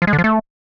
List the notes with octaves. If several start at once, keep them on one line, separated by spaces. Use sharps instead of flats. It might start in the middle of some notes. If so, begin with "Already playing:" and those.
F3
G#3
D3
F3
A3